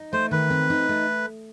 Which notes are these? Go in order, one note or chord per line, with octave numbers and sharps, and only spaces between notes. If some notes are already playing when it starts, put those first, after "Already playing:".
Already playing: D#4
A3 C5
D#3 B4
C4
D#4
A3